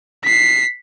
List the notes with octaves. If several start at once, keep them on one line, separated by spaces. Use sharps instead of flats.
B6 C7